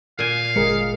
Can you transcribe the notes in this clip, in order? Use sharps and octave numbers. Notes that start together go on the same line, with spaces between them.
A#2 F5 G#5
G1 G#3 G#4 A#4 C#7